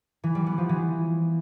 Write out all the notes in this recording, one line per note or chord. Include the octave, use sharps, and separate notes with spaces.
E3
G3
B3
F3
E3